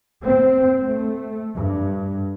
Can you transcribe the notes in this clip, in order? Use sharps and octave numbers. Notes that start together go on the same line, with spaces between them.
C4
A3
G2